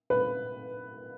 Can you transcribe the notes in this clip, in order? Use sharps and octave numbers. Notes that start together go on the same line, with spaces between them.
B4